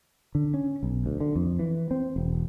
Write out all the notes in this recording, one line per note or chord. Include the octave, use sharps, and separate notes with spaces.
D3
C#4
B1
D2
D3
F2
E3
C4
E1